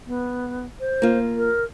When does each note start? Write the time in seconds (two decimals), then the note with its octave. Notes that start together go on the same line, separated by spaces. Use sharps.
0.07 B3
0.80 C5
1.02 A#3 F4
1.37 A#4